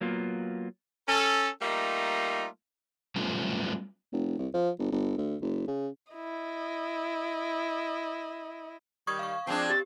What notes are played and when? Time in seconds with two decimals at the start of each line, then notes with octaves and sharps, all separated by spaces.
0.01 F#3 A#3 B3 F4
1.09 C#4 A4
1.62 G3 A3 A#3 D#4 F4
3.16 F#3 G3 A3 B3 C#4 F4
4.12 F1
4.39 C2
4.54 F3
4.79 G1
4.92 G1
5.18 D2
5.41 F#1
5.67 C#3
6.12 E4 D#5
9.07 D#3 G3 C#6 D#6 G#6
9.19 F5 C#6
9.47 F3 G#3 C4 D4
9.70 G4 A6